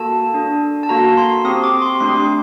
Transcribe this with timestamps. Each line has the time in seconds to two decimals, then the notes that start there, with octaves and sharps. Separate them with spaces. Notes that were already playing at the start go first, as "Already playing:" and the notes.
Already playing: A#3 F#4 A4 A5
0.34 D4 A4
0.83 A5
0.89 A#3 F#4 A4 A#5
1.17 C6
1.45 C4 G4 D#6
1.64 D6
1.82 C6
2.00 A3 D4 G4 C6